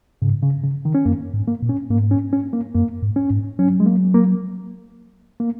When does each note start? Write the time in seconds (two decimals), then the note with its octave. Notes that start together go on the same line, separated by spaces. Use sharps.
0.22 G#2 C#3
0.43 C#3
0.64 C#3
0.85 D#3
0.95 C#4
1.05 F#2 A#3
1.34 G#2
1.47 A#3
1.62 A#2
1.69 C#4
1.90 G#2 A#3
2.11 C#4
2.33 C#4
2.53 A#3
2.74 F#2 A#3
3.02 G#2
3.16 C#4
3.30 G#2
3.59 F#3 C#4
3.80 G#3
3.86 A#3
4.15 A#3
5.40 A#3